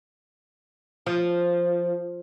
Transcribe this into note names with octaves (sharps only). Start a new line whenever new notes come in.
F3